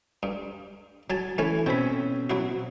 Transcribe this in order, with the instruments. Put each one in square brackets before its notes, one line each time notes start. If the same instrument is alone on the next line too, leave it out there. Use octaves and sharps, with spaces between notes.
[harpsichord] G2
F#3 G#5 A5
[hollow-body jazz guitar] E3 [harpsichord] A3 C#4 G#5
[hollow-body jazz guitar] B2 C4 C#4 [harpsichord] G5 B5
[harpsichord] F#3 E4 F#4